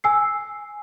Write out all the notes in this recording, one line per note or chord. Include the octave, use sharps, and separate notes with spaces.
G#5 E6 C7